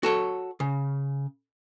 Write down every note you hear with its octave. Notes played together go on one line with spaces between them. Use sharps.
F#4 A4 C#5
C#3